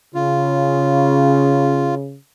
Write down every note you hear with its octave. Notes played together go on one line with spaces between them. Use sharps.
C#3 F4